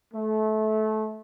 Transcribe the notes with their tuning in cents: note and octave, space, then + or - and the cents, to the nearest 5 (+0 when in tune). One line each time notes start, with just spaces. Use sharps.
A3 -25